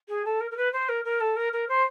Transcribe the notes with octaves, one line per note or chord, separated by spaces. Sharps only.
G#4
A4
A#4
A#4
B4
C5
A#4
A#4
A4
A#4
A#4
C5